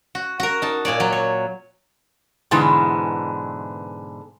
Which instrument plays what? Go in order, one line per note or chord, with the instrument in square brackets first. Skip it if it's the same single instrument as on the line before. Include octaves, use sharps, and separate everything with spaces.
[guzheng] F#4
F#4 A#4
D#4 A5
A#2 C#5 D5
F#3
C#5
[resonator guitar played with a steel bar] G#2 B2 D3 E3 G#3